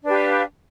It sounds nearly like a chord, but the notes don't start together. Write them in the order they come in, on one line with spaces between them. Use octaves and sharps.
D4 B4 G4 F5